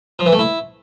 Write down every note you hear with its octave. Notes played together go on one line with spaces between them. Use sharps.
F3
E3
A3
E4